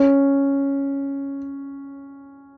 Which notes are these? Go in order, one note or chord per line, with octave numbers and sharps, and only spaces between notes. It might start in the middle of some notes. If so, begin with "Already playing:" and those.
Already playing: C#4